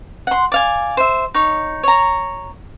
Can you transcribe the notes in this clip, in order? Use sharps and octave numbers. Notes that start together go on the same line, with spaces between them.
F#5 C6
D5 F5 G#5
C5 E5
D#4 C#5
C#5 A#5